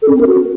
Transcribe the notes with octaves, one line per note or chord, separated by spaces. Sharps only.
A4
C#4
C4
A#4
F#4